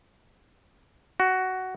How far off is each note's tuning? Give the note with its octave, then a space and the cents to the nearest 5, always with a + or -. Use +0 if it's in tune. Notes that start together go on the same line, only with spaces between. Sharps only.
F#4 +10